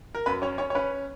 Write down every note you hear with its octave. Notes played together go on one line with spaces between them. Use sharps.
A#4
F#2 B4
C#4 C#5
C#4 C#5
C#5
C#4 B4